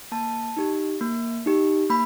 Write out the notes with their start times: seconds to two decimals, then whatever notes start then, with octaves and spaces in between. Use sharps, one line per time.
0.12 A#3 A5
0.57 D#4 G4
1.01 A#3
1.46 D#4 G4
1.90 A#3 B5